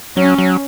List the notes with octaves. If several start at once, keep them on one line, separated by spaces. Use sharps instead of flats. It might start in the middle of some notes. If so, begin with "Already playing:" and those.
F#3 C#4
F#3